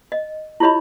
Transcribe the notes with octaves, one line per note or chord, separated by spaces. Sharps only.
D#5
E4 F4 G4 C#5 D#5 B5